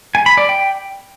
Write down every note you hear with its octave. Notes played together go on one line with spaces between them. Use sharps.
G#5
B5
D5
G5